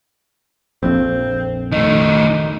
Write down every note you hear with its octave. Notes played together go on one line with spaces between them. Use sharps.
A#1 F2 C4
D#3 A3 D#4